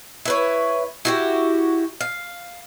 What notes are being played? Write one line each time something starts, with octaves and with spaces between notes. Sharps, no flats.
E4 B4 C#5
E4 F#4 G4
F5